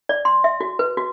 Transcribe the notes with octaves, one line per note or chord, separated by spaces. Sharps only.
D5
C6
E5
F#4
B4
F#4